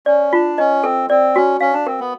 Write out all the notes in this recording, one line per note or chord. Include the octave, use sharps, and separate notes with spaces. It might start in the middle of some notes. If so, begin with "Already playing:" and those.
C#4 D5
D4 F4
C#4 D#5
C4 A4
C4 D5
C#4 F#4
C#4 F5
D4
C4 A#4
B3